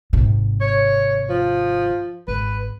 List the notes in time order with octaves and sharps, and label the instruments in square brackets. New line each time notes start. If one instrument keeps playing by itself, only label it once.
[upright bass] G#1 C3
[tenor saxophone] C#5
F3
[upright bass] G#1 [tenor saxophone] B4